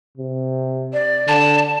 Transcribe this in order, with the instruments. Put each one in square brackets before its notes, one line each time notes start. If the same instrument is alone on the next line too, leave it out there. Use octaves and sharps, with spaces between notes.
[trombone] C3
[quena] D5
[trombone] D3 [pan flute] A5